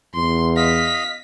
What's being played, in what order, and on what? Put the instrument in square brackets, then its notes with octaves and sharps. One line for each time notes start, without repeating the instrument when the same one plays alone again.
[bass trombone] E2 [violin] C6
[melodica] D#5 F5 [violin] B6